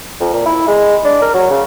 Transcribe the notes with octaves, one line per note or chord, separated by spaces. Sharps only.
F2
A#2
E4
G#3
D4
A#4
F#3
C#3